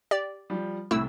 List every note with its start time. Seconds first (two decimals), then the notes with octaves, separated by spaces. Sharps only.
0.11 G4 D5
0.50 F3 G3
0.91 C2 A2 A3 E4 E6